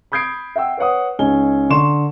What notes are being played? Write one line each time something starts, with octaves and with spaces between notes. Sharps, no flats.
B5 D#6 G6 G#6 C7 D7
E5 F#5 G5 E6
B4 C#5 F#5 D#6
C#2 C#4 D#4 G#5 G7
D3 C6 C#6 E7